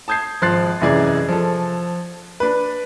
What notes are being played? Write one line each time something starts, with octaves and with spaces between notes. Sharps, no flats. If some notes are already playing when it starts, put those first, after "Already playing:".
A5 D#6 G6 G#6 C7
G#1 F3 C6 F#6 A6 C7
F1 F#2 E3 G#4 D5 G#6
F3 A4
D4 B4